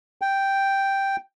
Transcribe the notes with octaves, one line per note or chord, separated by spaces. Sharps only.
G5